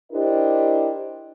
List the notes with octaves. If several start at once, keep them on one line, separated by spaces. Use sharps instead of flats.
D4 E4 G4 A#4 C5 D#5